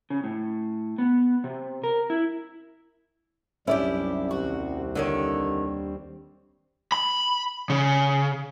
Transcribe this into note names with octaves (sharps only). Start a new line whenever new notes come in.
C#3
A2
B3
C3
A#4
E4
C2 F#2 C#4 D4 E4 G4 D5
D#2 G3 C4 F#4
D3 D#3 D4 C#5
B5
C#3